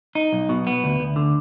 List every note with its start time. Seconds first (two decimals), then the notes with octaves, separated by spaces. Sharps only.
0.15 D#4
0.33 B1
0.49 B2
0.67 B3
0.84 D2
1.00 D2
1.16 D3